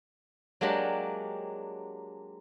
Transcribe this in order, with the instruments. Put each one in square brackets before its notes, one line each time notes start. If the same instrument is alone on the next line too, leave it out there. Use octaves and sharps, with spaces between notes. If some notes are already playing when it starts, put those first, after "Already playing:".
[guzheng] F#3 G#3 A#3 D4 G4